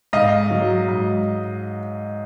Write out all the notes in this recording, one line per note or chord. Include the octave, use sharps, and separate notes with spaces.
G#2 D#5 F5
F#3
G#2